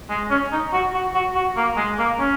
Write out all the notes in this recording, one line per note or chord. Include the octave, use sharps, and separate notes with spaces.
G#3
C#4
D#4
F#4
F#4
F#4
F#4
A#3
G#3
A#3
C#4